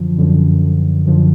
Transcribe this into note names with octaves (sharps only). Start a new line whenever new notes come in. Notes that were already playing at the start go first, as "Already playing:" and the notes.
Already playing: F#2 D3 F3
F#2 D3 F3
F#2 D3 F3